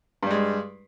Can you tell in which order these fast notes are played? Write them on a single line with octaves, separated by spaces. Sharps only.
G2 G3 G#3